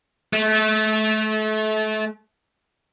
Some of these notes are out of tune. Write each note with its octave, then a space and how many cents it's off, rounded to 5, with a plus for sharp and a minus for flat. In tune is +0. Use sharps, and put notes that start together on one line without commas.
A3 -30